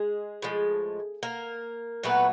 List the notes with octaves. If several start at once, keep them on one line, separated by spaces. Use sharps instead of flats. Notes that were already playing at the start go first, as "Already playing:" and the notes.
Already playing: G#3 G#4
A2 F3 G#3
A#3 A#4
A#2 F#3 A3 B3 B4